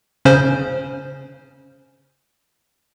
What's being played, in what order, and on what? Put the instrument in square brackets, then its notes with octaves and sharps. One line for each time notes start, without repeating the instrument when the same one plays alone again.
[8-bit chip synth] C#3 C#4 C5